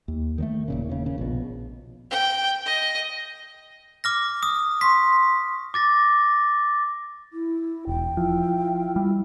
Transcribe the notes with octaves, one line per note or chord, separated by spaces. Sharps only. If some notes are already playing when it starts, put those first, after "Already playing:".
D#2
D#3 F#3 A3
D#1 A#2 C#3
E1 D#2 C#3
C#3
A#1 B2
G5
D#5
D6 F6 A#6
D#6
C6 C#6 B6
D6 A6 A#6
E4
E1 G5
F3 E4 F4
G3